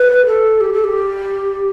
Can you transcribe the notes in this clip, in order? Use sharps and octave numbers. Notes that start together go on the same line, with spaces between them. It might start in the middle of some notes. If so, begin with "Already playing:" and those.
Already playing: B4
A4
G4
A4
G4